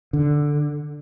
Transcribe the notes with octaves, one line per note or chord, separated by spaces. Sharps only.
D3